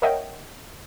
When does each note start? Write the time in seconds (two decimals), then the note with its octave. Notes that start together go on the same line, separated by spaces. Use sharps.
0.02 A#4 C#5 D#5 E5 F#5 G5